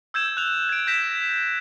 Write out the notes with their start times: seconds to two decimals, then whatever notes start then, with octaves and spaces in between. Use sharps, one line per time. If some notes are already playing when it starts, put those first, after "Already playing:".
0.14 E6 G6 G#6 E7
0.37 F#6 F7
0.69 G#6 D7
0.87 G6 A#6 B6 E7